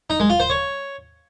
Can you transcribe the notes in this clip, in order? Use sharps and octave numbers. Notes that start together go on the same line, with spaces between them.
D#4
G#3
F4
C5
C#5